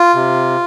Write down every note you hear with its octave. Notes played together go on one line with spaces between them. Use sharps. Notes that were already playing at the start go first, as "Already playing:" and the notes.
Already playing: F4
C3